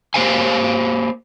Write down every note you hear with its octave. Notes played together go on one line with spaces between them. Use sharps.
A#3 G4 C5 F5 G#5